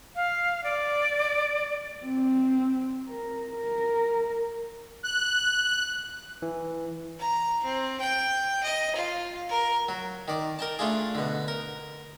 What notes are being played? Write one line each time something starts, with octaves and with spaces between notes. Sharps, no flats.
F5
D5
C4
A#4
A#4
F#6
E3
A#5
C4
G5
D#5
F4
A#4
F#3
D#3 D5
A#4 G5 A5
A3 D4 F4 G#4
B2 D3
A#4